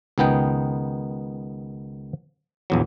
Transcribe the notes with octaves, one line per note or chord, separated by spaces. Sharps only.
C#2 D#3 B3 D#4 G5
A#1 E2 F#3